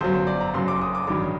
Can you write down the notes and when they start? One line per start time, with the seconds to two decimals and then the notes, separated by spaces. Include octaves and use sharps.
0.01 G1 F#2 F#3 C5
0.14 C5
0.27 D5
0.40 A#5
0.54 F#1 F#2 F#3 C6
0.68 D6
0.81 D#6
0.95 D6
1.07 A1 G2 D#3 F#3 D6